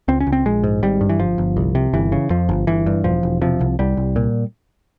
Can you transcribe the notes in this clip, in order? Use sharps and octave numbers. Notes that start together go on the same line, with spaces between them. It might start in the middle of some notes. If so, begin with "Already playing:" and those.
C#2 C4
C#4
C#2
C4
A#1 G#3
G#2
G#1 G3
G2
E3
G1 F3
G1
C2
C3
G1 E3
C#3
F2 F3
G1
G1 E3
G2
E1 F3
E1
C3 F3
C2
C2 G3
C2
A#2